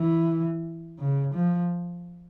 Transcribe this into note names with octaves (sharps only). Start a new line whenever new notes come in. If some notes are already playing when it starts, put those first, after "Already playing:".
Already playing: E3
C#3
F3